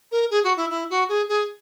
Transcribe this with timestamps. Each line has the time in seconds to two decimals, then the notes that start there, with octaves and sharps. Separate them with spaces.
0.12 A#4
0.31 G#4
0.44 F#4
0.57 E4
0.70 E4
0.90 F#4
1.09 G#4
1.29 G#4